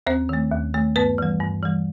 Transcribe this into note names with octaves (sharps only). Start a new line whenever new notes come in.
D#2 C4 C5
D#3 A3
D#2
D#3 A3
G2 B3 B4
E3 G3
G2
E3 G3